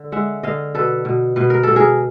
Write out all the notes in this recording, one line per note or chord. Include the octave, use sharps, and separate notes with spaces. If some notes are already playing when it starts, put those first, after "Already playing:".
Already playing: D3
G#3 E5 F#5
D3 D#5 F5
B2 A4 B4
B2
B2 B4
A#4
B2 A4
G#4 A#4